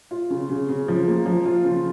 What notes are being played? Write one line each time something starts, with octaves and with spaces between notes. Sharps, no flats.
F4
C#3
C#3
C#3
F3
A#3
F3
F4
C#3